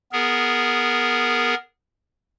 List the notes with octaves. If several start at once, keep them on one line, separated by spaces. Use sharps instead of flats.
B3 G#4 A#4